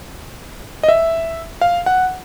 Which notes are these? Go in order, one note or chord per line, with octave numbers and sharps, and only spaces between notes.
D#5
E5
F5
F#5